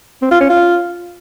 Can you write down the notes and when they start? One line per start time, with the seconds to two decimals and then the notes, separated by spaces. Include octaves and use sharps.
0.22 C4
0.32 F4
0.41 C#4
0.50 F4